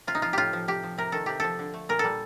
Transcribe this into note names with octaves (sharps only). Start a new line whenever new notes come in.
C3 F4
D#4
F3 F4
A2 F4 G4
F3
C3 G4
F3
C3 A#4
D#3 A4
C3 G4
F3 A4
D3
A3
A#2 A#4
G3 A4